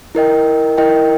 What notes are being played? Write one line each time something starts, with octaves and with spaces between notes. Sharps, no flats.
E4 A#4 D#5 G5
E4 A#4 D#5 G5